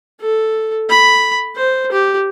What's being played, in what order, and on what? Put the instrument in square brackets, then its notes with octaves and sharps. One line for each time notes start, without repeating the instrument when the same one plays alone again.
[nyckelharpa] A4
B5
C5
G4